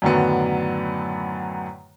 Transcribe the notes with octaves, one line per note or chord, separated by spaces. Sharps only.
F#2 A2 D3 D#3 F#3 B3